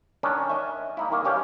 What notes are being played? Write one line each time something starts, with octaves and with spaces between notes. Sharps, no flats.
D#3 C#4 D4
D#5 E5
A#3 D#4 E4
D#3 A#3
G2 C#4 G4 F5